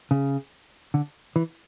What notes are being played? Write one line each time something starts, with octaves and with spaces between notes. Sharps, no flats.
C#3
D3
E3